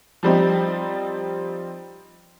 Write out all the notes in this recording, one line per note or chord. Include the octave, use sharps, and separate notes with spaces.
F3 G3 C4 D#4